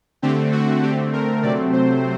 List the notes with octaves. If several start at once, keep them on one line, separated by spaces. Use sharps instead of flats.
D3 A3 C4 G4
F#4
D3 A3 C4 G4
A#4
C3 F#3 A3 C4 D5
C5